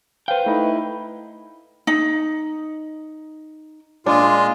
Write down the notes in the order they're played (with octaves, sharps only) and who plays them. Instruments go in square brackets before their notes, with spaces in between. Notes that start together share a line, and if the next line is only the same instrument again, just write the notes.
[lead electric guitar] B4 G5 [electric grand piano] C5 F5
[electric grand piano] A3 D#4 [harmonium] E4
[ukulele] D#4
[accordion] A#2 F4 [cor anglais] G#3 [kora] D4